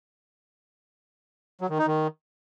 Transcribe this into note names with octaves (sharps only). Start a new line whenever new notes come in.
F#3
D#3
D#4
D#3